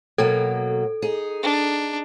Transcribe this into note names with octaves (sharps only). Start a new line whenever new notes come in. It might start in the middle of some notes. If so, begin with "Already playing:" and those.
B2 F#3 A#3 A4
D#4 G#4
D4